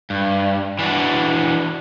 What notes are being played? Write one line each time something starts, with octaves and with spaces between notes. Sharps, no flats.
G2
E3 D4 F#4